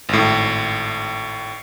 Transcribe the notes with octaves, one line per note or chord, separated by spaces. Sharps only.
G#1 A2